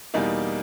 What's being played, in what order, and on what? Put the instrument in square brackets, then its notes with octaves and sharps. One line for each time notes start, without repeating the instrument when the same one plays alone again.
[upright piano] E2 B2 G3 A#3 D#4